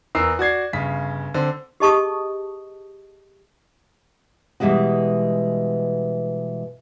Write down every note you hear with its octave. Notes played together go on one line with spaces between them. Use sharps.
E2 A#4 E6 C7
F#4 D5 G#6 C7
G1 C#3 B6
D3 C4
G4 G#4 D#5 A5 C#6 D#6
B2 E3 G3 G#3 F#4